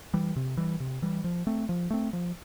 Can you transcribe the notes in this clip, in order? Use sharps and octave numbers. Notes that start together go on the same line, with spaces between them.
E3 G3
C3
E3 G3
C3
E3 G3
F3
A3 C4
F3
A3 C4
F3